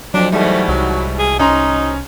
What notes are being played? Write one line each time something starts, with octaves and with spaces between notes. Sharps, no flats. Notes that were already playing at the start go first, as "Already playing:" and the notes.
F2 F3 F#3 D4
G#2 B2 E3 G3 A3
C2 F#3
G#4
C#4 D#4 A#5 C6